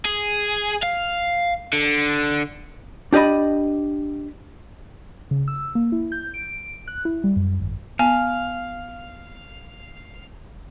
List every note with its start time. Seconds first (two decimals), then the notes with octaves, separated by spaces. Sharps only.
0.05 G#4
0.83 F5
1.73 D3
3.13 D4 G4 D5 D#5 B5
5.31 C#3
5.48 E6
5.75 A#3
5.92 E4
6.12 G6
6.34 D7
6.88 F#6
7.05 E4
7.24 G3
7.36 F#2
7.60 G#1
7.99 B3 F5 G#5